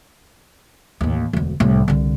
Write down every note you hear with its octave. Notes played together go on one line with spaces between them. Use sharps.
A1 D#2
E1 D2
C2 A2
C2 D3